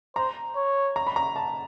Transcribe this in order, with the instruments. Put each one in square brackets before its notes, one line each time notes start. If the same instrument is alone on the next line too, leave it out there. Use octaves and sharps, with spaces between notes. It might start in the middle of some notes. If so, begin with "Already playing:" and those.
[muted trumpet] C5 [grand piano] A#5
[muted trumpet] C#5
[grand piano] A#5
B5
A#5
A5